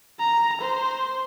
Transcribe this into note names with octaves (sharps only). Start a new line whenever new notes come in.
A#5
C5